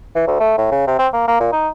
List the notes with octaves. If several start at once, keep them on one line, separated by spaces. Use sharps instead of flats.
E3
D2
A3
A2
C#3
C3
C4
A#3
A#3
A#2
D#4